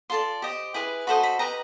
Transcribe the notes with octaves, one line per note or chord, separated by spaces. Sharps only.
F4 A4 D5 C6
G4 C5 D#5
E4 G#4 B4
F#4 A4 C5 D#5 B5
B5
G4 B4 D#5 A#5